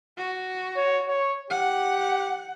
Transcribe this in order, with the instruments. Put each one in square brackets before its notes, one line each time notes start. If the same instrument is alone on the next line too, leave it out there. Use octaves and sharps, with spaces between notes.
[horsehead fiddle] F#4
[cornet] C#5
C#5
[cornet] G4 [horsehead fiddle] F#5